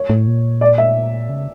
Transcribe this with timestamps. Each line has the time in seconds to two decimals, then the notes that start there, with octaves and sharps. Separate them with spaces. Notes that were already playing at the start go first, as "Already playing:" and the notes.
Already playing: C#5
0.10 A2
0.27 A#2
0.61 D5
0.78 E5
1.29 C#3